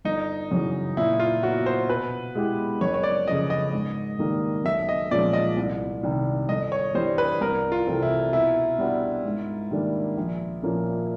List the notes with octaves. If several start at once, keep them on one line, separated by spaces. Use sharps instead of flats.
G1 D#4
F#2 C#3 E3
A#2 E4
F4
F#3 B3 F#4
C5
B2 B4
G#3 B3 E4 G4
F#1 C#5
C#5
D5
F2 C#3 D#5
D#5
G#2
D#3 G3 A#3
B1 E5
D#5
A#2 F3 G#3 C#4 D5
D#5
C2
C3 D#3 G3
G1 D#5
C#5
G2 E3 G3 C5
B4
C2 A#4
F4
C3 E3 A3 C4
E4
B2 E4
G3 B3 D4 F#4
G#2
D#3 G3 A#3 D4
A#1
A#2 F3 A#3 C#4